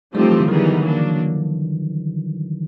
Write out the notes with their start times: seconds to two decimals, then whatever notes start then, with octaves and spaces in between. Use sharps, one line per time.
0.14 F3 G3 A3 C4 D#4 G4
0.23 F#3
0.32 E3
0.40 D3
0.48 D#3 E3 G3 B3 D#4 G#4
0.66 D#3
0.83 F#3 A#3 D4